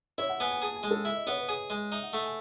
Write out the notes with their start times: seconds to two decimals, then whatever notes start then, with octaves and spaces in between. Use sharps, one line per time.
0.18 E4 C#5
0.29 F#5
0.40 B3 G#5
0.51 G#5
0.62 G#4 A5
0.75 G#5
0.83 G#3
0.91 A4
1.04 E4 E5
1.16 D#5
1.27 B3 C#5
1.37 B4
1.49 G#4
1.70 G#3
1.92 D#4 E5
2.03 F#5
2.13 A3 F#5
2.24 G#5